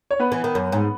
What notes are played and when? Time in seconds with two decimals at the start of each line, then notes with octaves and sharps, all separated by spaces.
0.11 C#5
0.20 B3 B4
0.32 E3
0.44 D#3
0.55 F#2
0.72 G#2